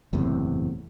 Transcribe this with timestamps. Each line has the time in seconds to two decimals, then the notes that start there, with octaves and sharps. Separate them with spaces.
0.13 F#1 E2 A2 C3